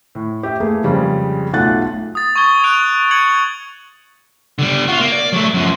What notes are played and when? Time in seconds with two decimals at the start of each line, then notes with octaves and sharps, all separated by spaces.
0.15 A2
0.43 G4 E5
0.60 A3 A#3 G#4 B4
0.84 F2 C#3 G3 G#3
1.53 B1 A3 F4 F#5 F#6 A6
2.15 D#6 A6
2.36 C#6 D#6 G#6 G7
2.64 F#6 D7 F7
3.11 G#6 C#7 F#7
4.59 D3 G3
4.88 F4 F#4
4.99 A#3
5.12 D5
5.32 F#3 A3
5.54 F#2 F3